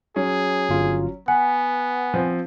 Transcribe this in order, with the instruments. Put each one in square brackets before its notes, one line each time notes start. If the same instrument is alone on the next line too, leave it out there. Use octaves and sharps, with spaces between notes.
[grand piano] F#3 C#4 [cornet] G#4
[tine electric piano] G1 F4
[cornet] B3 [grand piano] B4 [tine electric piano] F#5 [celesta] G#5
[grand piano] F3 C4